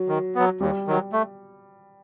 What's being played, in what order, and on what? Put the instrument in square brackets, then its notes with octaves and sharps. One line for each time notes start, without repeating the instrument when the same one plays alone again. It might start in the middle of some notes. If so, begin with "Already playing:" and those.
Already playing: [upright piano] F#3
[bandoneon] D#3
F#3 B3
[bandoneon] D#2 [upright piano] G3
[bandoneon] D#3 F#3
A3